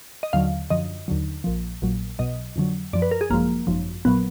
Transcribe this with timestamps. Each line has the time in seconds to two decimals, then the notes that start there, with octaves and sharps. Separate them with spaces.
0.23 D#5
0.33 D#2 D3 F#3 F5
0.70 F#2 D3 F3 D#5
1.08 D#2 D3 F#3
1.44 A#1 A#2 F3
1.82 A#1 A#2 F#3
2.19 B1 B2 F#3 D#5
2.56 F2 D3 F#3
2.93 F#2 F3 D5
3.02 B4
3.11 A#4
3.21 G#4
3.30 G#1 F#2 F3 A#3
3.67 G#1 F#2 F3
4.05 A#1 A#2 F#3 B3